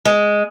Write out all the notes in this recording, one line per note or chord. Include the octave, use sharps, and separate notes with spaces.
G#3